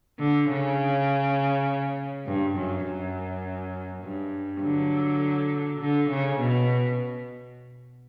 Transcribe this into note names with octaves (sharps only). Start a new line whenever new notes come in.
D3
C#3
G2
F#2
F#2
G2
D3 F#3
D3
C#3
B2